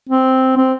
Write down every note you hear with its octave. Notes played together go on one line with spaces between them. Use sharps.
C4
C4